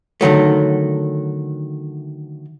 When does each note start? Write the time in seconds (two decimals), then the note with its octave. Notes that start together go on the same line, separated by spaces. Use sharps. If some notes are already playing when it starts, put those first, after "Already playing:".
0.21 D3 D#3 F#3 A3